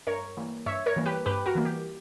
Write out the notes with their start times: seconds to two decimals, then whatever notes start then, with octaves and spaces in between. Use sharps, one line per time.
0.07 G2 A#4 C#5
0.37 E3 G3 A#3
0.66 G2 C#5 E5
0.86 A#4 C#5
0.96 E3 G3 A#3
1.06 G4 B4
1.26 G2 G4 B4
1.46 F#4 A#4
1.55 E3 G3 A#3
1.65 G4